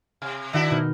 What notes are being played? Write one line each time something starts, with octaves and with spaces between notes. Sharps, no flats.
C3 G#5
D#3 D4 E4 F#4
B2 D#4 F6